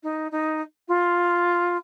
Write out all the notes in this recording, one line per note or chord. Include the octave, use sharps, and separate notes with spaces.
D#4
D#4
F4